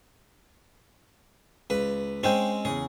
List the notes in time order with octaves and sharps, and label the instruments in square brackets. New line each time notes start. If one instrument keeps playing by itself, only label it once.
[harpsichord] C#2 B4
[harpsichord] G#3 C4 C#4 [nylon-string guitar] C5 G5
[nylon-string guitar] E2 C#3 [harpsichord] G#4